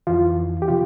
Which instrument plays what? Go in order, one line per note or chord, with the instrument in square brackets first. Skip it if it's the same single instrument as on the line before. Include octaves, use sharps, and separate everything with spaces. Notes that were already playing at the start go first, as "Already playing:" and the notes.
[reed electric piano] F2 E3 F4
G4
C3 F3 F4